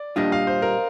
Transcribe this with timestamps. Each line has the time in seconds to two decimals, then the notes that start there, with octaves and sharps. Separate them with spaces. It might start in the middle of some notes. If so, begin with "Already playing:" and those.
Already playing: D5
0.16 A#2 G3 D4 F4 D#5
0.32 F5
0.47 C5
0.62 A#4